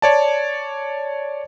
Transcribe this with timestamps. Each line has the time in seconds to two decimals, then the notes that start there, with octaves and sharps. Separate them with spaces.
0.02 C#5 D5 A5